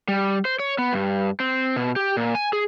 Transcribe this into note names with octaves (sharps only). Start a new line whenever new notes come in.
G3
C5
C#5
B3
G2
C4
B2
G4
A#2
G#5
G#4